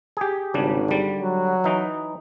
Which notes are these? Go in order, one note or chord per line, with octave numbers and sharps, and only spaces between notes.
G4 G#4
G#1 C#3 G3 D4
D3 G3
F#3
E3 D#4